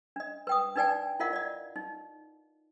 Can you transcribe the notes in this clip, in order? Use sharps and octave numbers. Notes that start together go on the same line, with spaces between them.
D4 D#5
B4 G5 D#6
D4 D#4 B4 D5 G5 G#5
E4 F4 A#4 D#5 F5 F#5
D5 D#5
D#4